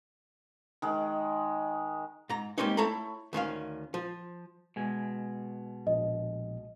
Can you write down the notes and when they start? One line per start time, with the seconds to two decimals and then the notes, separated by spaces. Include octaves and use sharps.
0.82 D#3 G#3
2.30 G#2 A#5
2.58 G3 G#3 A#3 C4 C#4 D#4
2.77 A3 E4 A4 C#5 A#5 B5
3.33 D2 D#3 C#4 F5
3.94 F3
4.76 B2 G#3 G#5
5.87 A#1 D#5